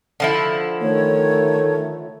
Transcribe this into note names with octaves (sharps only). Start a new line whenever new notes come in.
D3 F3 E4
D#3 A3 C#5